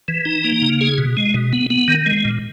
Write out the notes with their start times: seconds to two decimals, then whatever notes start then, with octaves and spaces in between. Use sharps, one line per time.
0.08 E3
0.25 D#4
0.44 A#3
0.62 C#3
0.81 G#4
0.98 B2
1.17 G#3
1.34 B2
1.53 B3
1.70 B3
1.88 D#3
2.06 G#3
2.25 A#2